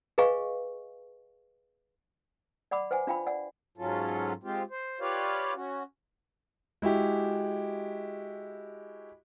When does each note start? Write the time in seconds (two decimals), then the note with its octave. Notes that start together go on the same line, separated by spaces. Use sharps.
0.18 G#4 B4 D#5 F5 G#5 C#6
2.71 D5 F#5 B5 D6
2.91 B4 C5 F#5 G#5
3.07 D4 F4 F5 G5 B5
3.26 D5 F#5
3.78 G#2 F#3 C#4 F4 A4
4.44 G#3 C4 F4 G4
4.71 C5
5.00 F4 G4 B4 C#5 D5 F5
5.55 C#4 F#4
6.82 G#3 E4 F#4 G4